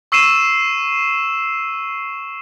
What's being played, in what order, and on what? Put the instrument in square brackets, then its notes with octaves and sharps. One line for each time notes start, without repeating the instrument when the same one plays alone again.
[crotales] C#6 E6 C7 D#7 E7